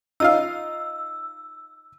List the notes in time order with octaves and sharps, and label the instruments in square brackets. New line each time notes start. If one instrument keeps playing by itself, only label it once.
[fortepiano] D#4 F4 F5 [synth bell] E6